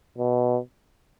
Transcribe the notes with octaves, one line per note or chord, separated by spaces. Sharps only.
B2